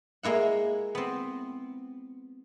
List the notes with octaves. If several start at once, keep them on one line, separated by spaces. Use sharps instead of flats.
G#3 A#3 E4 F#5
B3 C4